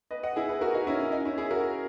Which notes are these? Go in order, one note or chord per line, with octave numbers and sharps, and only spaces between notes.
B4 D#5
D#5 F#5
E4 G#4
G#4 B4
F#4 A#4
D#4 F#4
C#4 E4
C#4
D#4
C#4 E4
E4 G#4
F#4 A#4